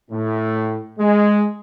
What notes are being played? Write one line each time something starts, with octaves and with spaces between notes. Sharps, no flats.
A2
G#3